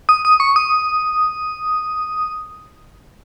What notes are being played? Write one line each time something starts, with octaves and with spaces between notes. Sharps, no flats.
D#6
D#6
C#6
D#6